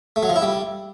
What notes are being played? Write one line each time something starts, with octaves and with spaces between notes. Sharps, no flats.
A3
F#3
F3
E4
G3